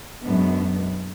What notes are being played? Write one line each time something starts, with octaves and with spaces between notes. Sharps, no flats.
F#2 B2 G#3 B3 D4